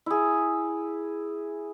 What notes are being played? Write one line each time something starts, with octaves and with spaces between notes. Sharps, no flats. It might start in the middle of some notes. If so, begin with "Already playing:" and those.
E4 G#4